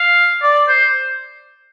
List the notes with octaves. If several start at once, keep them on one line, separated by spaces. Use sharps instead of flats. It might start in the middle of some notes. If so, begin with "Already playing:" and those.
Already playing: F5
D5
C5